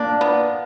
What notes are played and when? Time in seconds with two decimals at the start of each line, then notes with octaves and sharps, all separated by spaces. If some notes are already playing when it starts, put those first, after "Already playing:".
Already playing: A#3 D4
0.21 B3